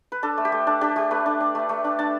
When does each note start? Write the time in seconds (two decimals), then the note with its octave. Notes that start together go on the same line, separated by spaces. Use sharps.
0.12 B4
0.23 D4 A4
0.38 A3
0.45 G4
0.52 A3
0.67 D4 A4
0.81 D4 G4
0.96 A3 G4
1.11 A3 B4
1.26 D4
1.40 D4
1.55 A3
1.69 A3
1.84 D4
1.99 D4 A5